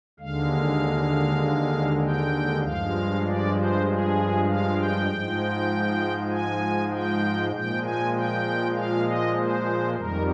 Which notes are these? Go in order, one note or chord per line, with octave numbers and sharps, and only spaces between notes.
D#2 D3 G#3 F5
G5
G2 F3 G#3 F5
D5
C5
G#4
F5
G5
G#2 F3 G#3
G#5
G5
A#2 F3 G#3 G5
G#5
G5
F5
D#5
C5
F2 D#3 G3 A#4